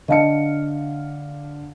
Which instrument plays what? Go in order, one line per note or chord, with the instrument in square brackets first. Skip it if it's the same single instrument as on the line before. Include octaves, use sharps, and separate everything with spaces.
[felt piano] D3 F5 C#7 [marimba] D#5 A5